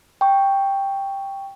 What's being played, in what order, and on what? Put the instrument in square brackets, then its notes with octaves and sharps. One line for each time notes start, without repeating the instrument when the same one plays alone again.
[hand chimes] G5 C#6